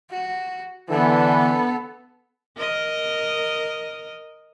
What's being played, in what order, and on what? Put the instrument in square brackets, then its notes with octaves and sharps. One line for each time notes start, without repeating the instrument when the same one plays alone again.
[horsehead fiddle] F#4
[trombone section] D3 E3 [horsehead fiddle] B3 A4
[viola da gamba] A#4 D#5